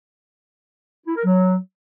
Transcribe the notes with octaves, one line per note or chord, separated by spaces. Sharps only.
E4
A#4
F#3